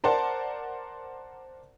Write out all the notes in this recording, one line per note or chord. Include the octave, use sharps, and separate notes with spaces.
A#4 C5 D5 F#5 A5